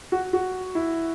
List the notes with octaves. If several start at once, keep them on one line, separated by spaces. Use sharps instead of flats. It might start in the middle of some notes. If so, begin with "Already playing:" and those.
F#4
F#4
E4